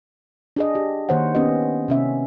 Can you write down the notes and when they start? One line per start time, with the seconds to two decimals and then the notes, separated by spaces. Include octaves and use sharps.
0.56 D4 G#4 D#5
0.75 G4
1.09 D#3 A#3 C5 C#5 F#5
1.35 B3 C#4 D4 G4 D#5
1.88 C3 C#4 E5